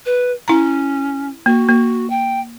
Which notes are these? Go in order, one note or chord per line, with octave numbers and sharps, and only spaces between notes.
B4
C#4 E4 A#5
A#3 F#4
A#3
G5